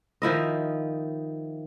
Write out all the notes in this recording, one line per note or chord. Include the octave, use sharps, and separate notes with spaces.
D#3 F3 E4 D#5